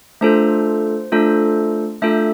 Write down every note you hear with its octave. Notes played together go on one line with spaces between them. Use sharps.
A3 D4 F4 A4 C5
A3 D4 F4 A4
A3 D4 F4 A4 E5